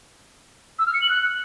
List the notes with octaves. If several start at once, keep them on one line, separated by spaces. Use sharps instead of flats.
E6
F6
C#7
F#7
F#6